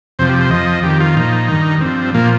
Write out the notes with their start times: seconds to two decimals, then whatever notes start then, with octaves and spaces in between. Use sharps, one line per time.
0.19 F2 C3 F3 C5
0.29 G4
0.41 C5
0.51 F2 F3 D#5
0.83 F2 D#3 G4
1.00 F4
1.16 A#2 F3 D#4
1.48 G2 D#3
1.81 G2 F3 C4
2.14 A#2 F3 A#3